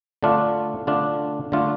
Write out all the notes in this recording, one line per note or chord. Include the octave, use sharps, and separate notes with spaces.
D3 A3 D4 F4
D3 A3 D4 F4
D3 A3 D4 F4